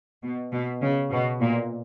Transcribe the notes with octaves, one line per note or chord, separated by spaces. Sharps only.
B2
B2
C#3
B2
A#2